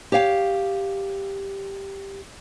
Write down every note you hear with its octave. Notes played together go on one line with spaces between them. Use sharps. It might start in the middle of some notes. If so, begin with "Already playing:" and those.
G4 C#5 F5 G5